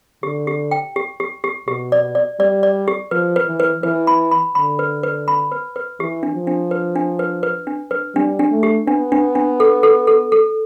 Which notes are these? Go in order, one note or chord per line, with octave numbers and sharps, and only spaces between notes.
D3 G4
G4
G5
G4
G4
G4
B2 G4
D5
D5
G3 D5
D5
G4
F3 B4
B4
E3
B4
E3 B4
B5
B5
D3 B5
B4
B4
B5
B4
B4
E3 G4
D4
F3
D4
B4
D4
B4
B4
D4
B4
G3 D4
D4
A3
G4
B3 D4
D4
D4
A4
A4
A4
A4